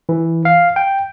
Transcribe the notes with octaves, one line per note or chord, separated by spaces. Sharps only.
E3
F5
G5